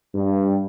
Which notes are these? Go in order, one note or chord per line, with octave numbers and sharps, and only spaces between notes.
G2